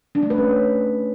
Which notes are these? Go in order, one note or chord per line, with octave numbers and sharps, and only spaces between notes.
D4
A3
B4
C#4